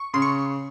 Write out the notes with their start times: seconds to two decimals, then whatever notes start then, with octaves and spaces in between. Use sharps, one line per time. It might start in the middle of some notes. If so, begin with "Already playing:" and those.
Already playing: C#6
0.13 C#3 C6
0.22 C#6